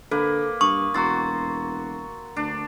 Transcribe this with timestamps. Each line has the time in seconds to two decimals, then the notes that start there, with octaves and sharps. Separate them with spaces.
0.11 D3 A#3 A4 B4
0.61 G2 C#6 D#6
0.95 E1 F#4 A#5 C6 E6 A6
2.36 D2 D4